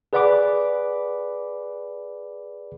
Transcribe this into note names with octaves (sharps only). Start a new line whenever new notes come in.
G#4 B4 D5 F#5 B5 D6